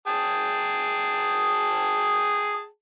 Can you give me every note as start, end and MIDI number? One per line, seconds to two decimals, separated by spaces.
0.07 2.66 68
0.07 2.66 79
0.07 2.66 81